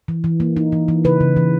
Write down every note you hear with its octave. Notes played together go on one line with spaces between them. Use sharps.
E3
E3
A#3
D#4
E3
E3
C#3 B4
C#3
E3